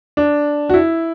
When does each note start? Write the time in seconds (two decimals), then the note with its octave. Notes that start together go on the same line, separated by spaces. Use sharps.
0.17 D4
0.69 F#4
0.74 E4